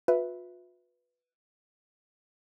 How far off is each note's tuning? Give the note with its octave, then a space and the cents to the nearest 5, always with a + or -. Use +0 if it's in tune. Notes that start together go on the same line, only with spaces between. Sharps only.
F4 +45 B4 +0 E5 +0